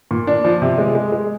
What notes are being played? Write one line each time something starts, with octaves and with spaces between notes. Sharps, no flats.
A#2
D4
F3
C3
G#3
G#3
G#3